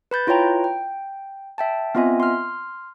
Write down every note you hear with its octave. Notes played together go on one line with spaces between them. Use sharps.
B4 B5 G6 A6
E4 F4 B4 C#5 G5 A#5
G5
E5 G5 A5
B3 C4 F4 D#5 E5 G#5
C6 F6